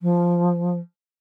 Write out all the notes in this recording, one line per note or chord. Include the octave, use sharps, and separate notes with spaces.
F3